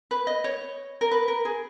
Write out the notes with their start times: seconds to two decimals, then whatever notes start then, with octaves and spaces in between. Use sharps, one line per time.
0.11 B4
0.27 D#5
0.44 C#5
1.01 A#4
1.11 B4
1.28 A#4
1.45 G#4